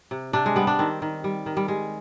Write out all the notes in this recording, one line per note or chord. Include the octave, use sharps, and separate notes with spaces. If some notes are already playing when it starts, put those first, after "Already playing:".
C3
C3 D4
G#3
G3 B3
D4
D#3 C4
D#3
G3
D#3
G3
G3 G#3